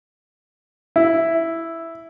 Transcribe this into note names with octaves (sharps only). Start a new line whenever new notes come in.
E4